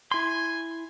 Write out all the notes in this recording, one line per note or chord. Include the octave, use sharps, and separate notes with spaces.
E4 G#5 C6